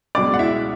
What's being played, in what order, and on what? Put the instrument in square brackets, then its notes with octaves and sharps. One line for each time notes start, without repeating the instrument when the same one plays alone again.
[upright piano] C#2 B2 G#3 D5 D6
F#5
E4 E5